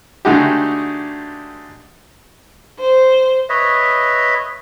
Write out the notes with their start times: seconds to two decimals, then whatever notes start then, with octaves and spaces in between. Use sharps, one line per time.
0.25 D3 G#3 A3 D#4 F#4 G4
2.80 C5
3.49 B4 C#5 D#5 E5